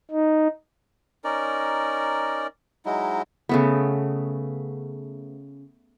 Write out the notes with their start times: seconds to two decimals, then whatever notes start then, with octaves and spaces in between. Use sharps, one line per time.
0.11 D#4
1.24 C#4 D#4 A#4 D5
2.86 F#3 G#3 D#4 E4
3.49 C#3 A3 B3